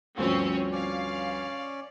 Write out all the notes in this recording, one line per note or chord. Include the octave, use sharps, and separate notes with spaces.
D2 G2 F3 C4 C#4 C#5
C#4 D5 F5